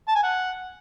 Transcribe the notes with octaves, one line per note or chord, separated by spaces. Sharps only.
A5
G#5
F#5